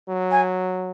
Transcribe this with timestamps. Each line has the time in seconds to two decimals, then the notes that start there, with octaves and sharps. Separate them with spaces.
0.09 F#3
0.32 G#5